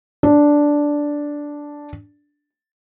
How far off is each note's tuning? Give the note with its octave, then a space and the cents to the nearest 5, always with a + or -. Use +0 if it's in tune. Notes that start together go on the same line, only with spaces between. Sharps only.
D4 -5